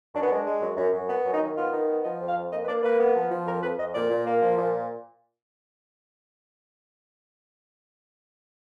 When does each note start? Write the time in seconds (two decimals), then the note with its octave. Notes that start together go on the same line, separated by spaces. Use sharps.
0.14 F#2 D4
0.22 B3
0.30 G#3 D4
0.45 G#3
0.61 F#2
0.77 F#2
0.93 F#2
1.08 B3
1.25 F#2
1.33 D#4
1.41 D#3
1.56 B3 F4
1.72 D#3
1.88 B3
2.03 F3 D#5
2.20 F2
2.28 F5
2.36 F2
2.51 A#3 D#5
2.63 B4
2.67 A#3 D5
2.83 A#3 B4
2.99 B3
3.15 F3
3.30 F3
3.46 F2 A#4
3.62 F2 B4
3.78 F2 D#5
3.94 A#2 D5
4.10 A#2
4.26 A#3
4.41 F3
4.57 A#2